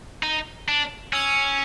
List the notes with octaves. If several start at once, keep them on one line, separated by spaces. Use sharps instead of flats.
D#4
D4
C#4 E6 G#6 C#7 F7